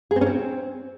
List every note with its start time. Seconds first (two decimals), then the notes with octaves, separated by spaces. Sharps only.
0.11 G#4
0.16 C4
0.21 C#4
0.26 C4